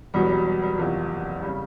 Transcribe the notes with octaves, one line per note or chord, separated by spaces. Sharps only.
E2 B2 F#3 G3
G3
G3
G3
F#1 E2 C3 F3
C#3 G3